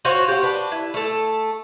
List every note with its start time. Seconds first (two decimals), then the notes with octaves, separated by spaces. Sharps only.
0.05 F4 F#4 C5 C#5
0.28 G4 F#5
0.43 D4 B4
0.72 E4
0.94 A3 A4